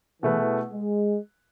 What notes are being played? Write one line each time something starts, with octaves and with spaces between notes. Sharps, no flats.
B2 E3 A3 E4 G#4 B4
G#3